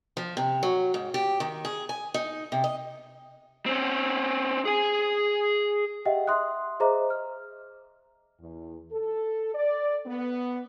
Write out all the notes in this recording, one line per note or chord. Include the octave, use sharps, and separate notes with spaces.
F3
C3
F#3
G#2
G4
D#3
G#4
G#5
D#4
C3
D#5
C4 C#4
G#4 G#5
G4 D#5 E5 F#5 G5
E5 C6 D#6 F#6
G#4 C5 D#5 E5 A#5 D6
F6
E2
A4
D5
B3